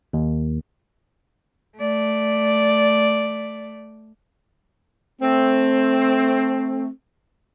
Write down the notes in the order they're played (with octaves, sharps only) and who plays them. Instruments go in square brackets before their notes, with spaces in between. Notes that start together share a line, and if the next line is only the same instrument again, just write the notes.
[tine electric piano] D#2
[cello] A3 D5
[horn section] A3 C4